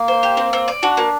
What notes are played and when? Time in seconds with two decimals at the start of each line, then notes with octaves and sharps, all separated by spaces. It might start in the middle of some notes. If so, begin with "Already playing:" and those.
Already playing: A#3
0.08 C5
0.23 G4
0.37 C4
0.53 C4
0.68 D5
0.83 D4 F#4
0.97 A#3